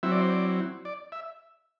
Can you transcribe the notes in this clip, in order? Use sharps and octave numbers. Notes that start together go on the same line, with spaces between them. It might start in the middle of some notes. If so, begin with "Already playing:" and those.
F#3 C4 E4 E5
D5
C5
D5
D5
E5